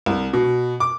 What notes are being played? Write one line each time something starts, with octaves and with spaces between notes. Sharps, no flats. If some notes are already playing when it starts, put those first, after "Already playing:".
C2
B2
D6